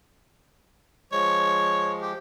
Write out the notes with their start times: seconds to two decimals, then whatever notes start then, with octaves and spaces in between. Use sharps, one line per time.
1.12 F3 G#3 C#5
2.01 G4